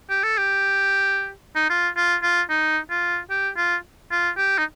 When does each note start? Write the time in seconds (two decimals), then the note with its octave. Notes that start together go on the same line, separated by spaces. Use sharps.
0.10 G4
0.23 A4
0.38 G4
1.56 D#4
1.70 F4
1.97 F4
2.23 F4
2.50 D#4
2.90 F4
3.30 G4
3.57 F4
4.11 F4
4.37 G4
4.58 D#4